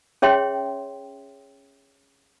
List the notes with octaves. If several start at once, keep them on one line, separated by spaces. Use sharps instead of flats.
C#4 G#4 C#5 E5 G5 C6